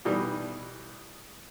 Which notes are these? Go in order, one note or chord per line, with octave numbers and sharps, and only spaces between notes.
B2 E3 G3 D#4